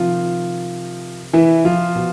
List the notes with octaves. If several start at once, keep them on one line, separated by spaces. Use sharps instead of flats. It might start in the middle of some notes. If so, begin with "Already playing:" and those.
Already playing: C3 D#3 F3 F4
E3 E4
F3 F4
B2